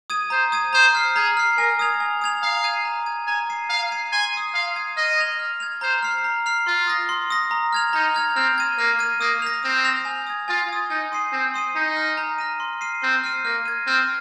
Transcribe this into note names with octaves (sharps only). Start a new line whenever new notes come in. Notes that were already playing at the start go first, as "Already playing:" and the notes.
D#6 G#6 D#7
C5 A#5
D#6 G#6 D#7
C5 A#5
F6 C7
G#4 A#5
F6 C7
A#4 G#5
D#6 G#6 F7
G#5
D#6 G#6 F7
F5 A#5
G#6 D#7
A#5
G#6 D#7
G#5 A#5
G#6 C7 D#7
F5 A#5
G#6 C7 D#7
G#5 C6
D#6 G#6 C7 D#7
F5 C6
D#6 G#6 C7 D#7
D#5 F6
G#6 F7
F6
G#6 F7
C5 A#5
F6 C7 F7
A#5
F6 C7 F7
F4 C6
D#6 A#6
C6
D#6 A#6
A#5
F6 G#6 F7
D#4 A#5
F6 G#6 F7
C4 F6
G#6 D#7
A#3 F6
G#6 D#7
A#3 D#6
A#6 F7
C4 D#6
A#6 F7
G#5
D#6 G#6
F4 G#5
D#6 G#6
D#4 G#5
C6 D#6 C7 D#7
C4 G#5
C6 D#6 C7 D#7
D#4 A#5
F6 A#6 D#7
A#5
F6 A#6 D#7
C6
F6 C7 D#7
C4 C6
F6 C7 D#7
A#3 F6
G#6 D#7
C4 F6